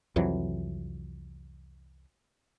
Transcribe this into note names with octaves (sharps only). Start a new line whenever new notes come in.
C2 F2 E3 F#3